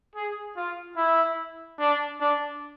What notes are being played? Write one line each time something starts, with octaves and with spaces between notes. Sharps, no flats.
G#4
F4
E4
D4
D4